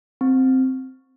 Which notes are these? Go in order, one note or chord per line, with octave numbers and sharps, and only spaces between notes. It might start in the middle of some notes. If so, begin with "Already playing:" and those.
C4